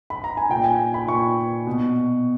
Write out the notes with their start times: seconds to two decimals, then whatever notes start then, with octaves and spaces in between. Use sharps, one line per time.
0.10 B5
0.24 A#5
0.37 G#5
0.49 A#2 G5
0.64 G#5
0.94 B5
1.08 A#2 C#6
1.67 B2